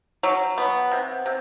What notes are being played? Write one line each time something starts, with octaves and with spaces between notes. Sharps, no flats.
F#3
B3
C3
C3